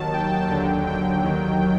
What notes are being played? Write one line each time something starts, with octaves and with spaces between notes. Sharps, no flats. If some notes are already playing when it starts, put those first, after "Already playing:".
Already playing: D#2 D#3 F#3 A5
G5
D#2 D3 F#3
G5
D#2 D#3 F#3